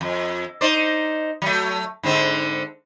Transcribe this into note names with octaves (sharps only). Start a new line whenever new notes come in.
F2
D#4 C5 D5
F#3 A3
G#2 D3 C4